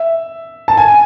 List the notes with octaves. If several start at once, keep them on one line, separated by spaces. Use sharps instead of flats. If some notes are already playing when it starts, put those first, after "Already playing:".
Already playing: E5
A5
G#5